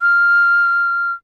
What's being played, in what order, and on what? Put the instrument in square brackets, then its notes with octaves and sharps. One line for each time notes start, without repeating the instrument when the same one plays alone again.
[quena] F6